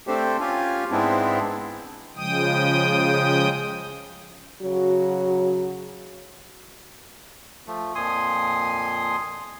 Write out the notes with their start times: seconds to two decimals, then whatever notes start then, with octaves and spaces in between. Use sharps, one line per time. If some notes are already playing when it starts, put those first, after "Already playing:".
0.07 A3 C4 D4 G4 A4 C5
0.41 C#4 F4 G4 F5 G#5
0.91 G#2 G#3 B3 C4 D4 E4
2.16 C#3 F3 G#3 G5 D#6
4.62 C#3 F#3 F#4
7.67 F3 A3
7.95 F2 A#2 F3 G#5 C6 D#6